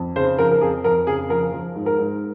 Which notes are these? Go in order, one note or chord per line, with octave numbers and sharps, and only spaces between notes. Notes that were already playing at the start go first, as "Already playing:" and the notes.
Already playing: F2
C#3 C5
F3 A#4
A#4
F2 G#4
F2 A#4
C#3 G#4
F3 A#4
F3
G#2
A#4
G#2